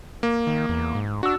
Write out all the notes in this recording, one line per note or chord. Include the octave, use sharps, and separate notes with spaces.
A#3
D#3
E2
G#2
D4 F#4 E6